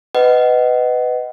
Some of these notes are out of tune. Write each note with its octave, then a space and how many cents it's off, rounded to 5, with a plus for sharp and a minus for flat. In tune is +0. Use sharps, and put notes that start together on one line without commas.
B4 +15 D#5 +0 F#5 +20